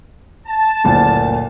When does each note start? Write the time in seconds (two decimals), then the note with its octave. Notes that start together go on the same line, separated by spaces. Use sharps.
0.46 A5
0.84 F#1 D2 A#2